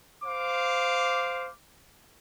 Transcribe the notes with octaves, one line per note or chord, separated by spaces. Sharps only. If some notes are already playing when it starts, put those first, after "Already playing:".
C5 F5 D6